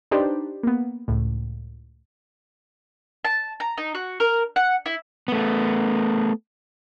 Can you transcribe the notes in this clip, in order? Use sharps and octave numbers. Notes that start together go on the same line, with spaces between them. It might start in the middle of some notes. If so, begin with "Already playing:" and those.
D4 D#4 G4 B4 C5 D5
A#3 B3
C#2 A2
A5
A#5
D#4
F#4
A#4
F#5
E4
A3 B3